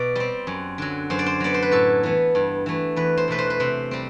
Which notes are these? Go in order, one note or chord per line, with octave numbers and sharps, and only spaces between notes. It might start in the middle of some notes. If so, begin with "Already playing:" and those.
Already playing: B2 D5
G3 C4
F#2
D3 F#3
F#2 C5
D5
C5
F#3 B3 D5
C5
B4
A2 A4
E3 B3
G2
E3 A3
E2 B4
C5
B2 A3 B4
C5
B4
C3 C5
G3 C4